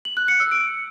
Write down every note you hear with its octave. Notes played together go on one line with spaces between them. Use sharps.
F#7
F#6
C#7
E6
D7